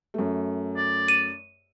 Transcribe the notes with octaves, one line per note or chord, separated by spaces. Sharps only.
F#2 A3
D5
D#7